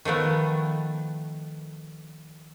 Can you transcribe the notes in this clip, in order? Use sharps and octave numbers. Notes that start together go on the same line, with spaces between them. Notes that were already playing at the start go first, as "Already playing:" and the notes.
D#3 F3 A3 B3